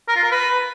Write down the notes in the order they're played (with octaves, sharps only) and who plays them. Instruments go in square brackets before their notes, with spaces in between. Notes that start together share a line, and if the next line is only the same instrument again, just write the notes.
[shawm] A#4
F4
A#4
B4